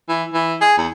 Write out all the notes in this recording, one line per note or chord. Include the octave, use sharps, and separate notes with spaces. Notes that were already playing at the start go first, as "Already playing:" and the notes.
E3
E3
G#4
E2